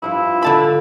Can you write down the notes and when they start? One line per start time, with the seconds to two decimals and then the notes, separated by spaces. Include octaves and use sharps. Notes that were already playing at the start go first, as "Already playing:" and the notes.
0.02 G2 F3 E4 F4
0.43 D3 A5 B5